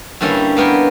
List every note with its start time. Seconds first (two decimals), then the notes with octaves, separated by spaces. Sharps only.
0.21 G2 D3 G3 A#3 C#4 E4
0.57 A#3 B3 A#4 C#5 G5